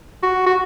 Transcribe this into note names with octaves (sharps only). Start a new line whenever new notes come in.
F#4
F#4